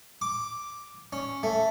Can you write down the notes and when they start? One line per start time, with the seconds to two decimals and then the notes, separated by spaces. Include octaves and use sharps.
0.22 D6
1.13 C#4
1.43 A3